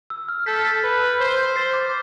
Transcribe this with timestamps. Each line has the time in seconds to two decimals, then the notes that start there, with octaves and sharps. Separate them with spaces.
0.10 E6
0.28 F6
0.46 A4 G6 B6
0.84 B4
1.19 C5
1.56 C5 A6 C7
1.73 D6